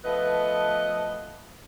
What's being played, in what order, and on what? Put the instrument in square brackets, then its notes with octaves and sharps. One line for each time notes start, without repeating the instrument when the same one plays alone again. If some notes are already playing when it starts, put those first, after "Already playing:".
[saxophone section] F3 A3 B3 B4 D#5